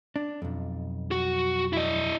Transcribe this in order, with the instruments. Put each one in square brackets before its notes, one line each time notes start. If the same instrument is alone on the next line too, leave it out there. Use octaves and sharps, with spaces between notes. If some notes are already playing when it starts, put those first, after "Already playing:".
[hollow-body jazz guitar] D4
B1 F2
[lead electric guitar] F#4
E4 D#5